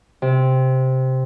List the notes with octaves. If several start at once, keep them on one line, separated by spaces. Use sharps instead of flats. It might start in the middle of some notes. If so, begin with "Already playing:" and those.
C3